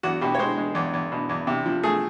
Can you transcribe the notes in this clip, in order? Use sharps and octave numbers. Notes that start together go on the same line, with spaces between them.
E2 F#4
B2 G4
C#5
G#3 C5
G#3
E2
E2
B2
E2
C3
F3
A3 G#4